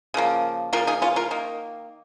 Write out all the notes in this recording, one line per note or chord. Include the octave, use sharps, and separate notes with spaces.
C#3 F3 A#3
C#3 F3 A#3 F4 A#4
D#4 G#4
C#4 F4
F4 A#4
D#3 A#3